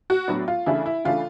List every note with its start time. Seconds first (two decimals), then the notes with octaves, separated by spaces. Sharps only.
0.10 F#4
0.28 A2 F#3 B3 D4
0.48 F4
0.66 C#3 E3 A3 D4 E4
0.86 E4
1.05 C#3 E3 A3 D4 F4